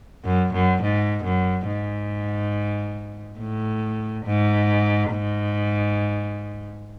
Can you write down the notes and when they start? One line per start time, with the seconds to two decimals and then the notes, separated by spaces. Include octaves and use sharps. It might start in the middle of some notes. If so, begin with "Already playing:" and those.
0.25 F#2
0.54 F#2
0.82 G#2
1.24 F#2
1.67 G#2
3.39 A2
4.26 G#2
5.11 G#2